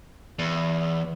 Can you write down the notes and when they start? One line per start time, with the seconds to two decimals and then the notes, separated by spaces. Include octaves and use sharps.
0.39 E2